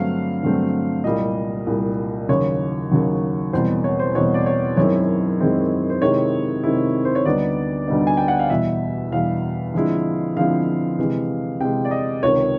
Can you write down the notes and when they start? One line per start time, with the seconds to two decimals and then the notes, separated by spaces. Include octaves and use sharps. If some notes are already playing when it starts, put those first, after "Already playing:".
Already playing: G2 D3 F#3 A3 C4 F5
0.43 G2 D3 F#3 A3 C4
1.04 C2 A#2 G3 D#5
1.67 C2 A#2 G3
2.29 D#2 C#3 F#3 C#5
2.91 D#2 C#3 F#3
3.53 E2 B2 G3 C4 C5
3.84 C#5
3.99 C5
4.15 E2 B2 G3 C4 C#5
4.34 D5
4.46 C#5
4.77 F#2 D#3 G#3 C4 E4 C#5
5.39 F#2 D#3 G#3 C4 E4
5.90 C5
6.02 C3 D#3 G#3 C4 E4 C#5
6.64 C3 D#3 G#3 C4 E4
7.05 C5
7.15 C#5
7.26 D2 D3 G3 B3 D#4 D5
7.88 D2 D3 G3 B3 D#4
8.07 G#5
8.17 G5
8.28 F#5
8.39 F5
8.50 E2 B2 G3 E5
9.12 E2 B2 G3 F5
9.74 D3 F3 G#3 C4 E4
10.36 D3 F3 G#3 C4 E4 F5
10.98 C3 E3 G#3
11.60 C3 E3 G#3 G5
11.85 D5
11.91 D#5
12.23 C#2 C3 D#3 C#5